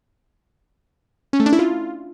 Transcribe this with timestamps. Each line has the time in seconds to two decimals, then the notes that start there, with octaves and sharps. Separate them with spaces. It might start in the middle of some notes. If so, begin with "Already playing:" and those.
1.33 C#4
1.40 A3
1.46 D4
1.53 E4
1.59 F4